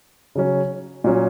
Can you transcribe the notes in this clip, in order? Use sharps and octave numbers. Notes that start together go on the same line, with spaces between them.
C#3 F#3 C#4
A#2 F#3 C#4